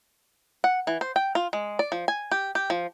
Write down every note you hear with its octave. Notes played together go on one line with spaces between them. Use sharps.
F#5
E3
C5
G5
F4
G#3
D5
F3
G#5
G4
G4
F3